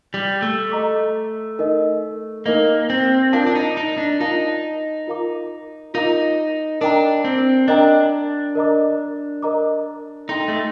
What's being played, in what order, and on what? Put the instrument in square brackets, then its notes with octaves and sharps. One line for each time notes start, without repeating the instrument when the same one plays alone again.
[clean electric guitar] G3
A3
[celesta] A4 D#5 A#5 D6
D#4 A#4 D#5
[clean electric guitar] A#3 [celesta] D#4 A#4 D#5
[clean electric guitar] C4
[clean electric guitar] D4 [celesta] F4 A#4 F5 A5
[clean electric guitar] D4
D#4
D#4
D4
[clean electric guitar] D#4 [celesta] F4 A#4 F5 A5
[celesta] F4 A#4 F5 A#5 D6
[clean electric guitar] D#4 [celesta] F4 A#4 F5 A#5 D6
[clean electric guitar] D4 [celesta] A#4 D#5 G5 A#5
[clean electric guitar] C4
[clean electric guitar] D4 [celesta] A#4 D#5 G5 A#5
[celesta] A#4 D#5 A#5 D6
A#4 D#5 A#5 D6
[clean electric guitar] D#4 [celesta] A4 D#5 G5 C6
[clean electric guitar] A3